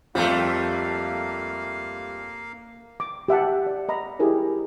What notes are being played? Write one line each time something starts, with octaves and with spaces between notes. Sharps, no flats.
F2 G3 A3 A#3 F5
D6
G4 E5 F#5 A5
D5
D#5 A#5 B5
E4 G4 G#4 A#4 C#5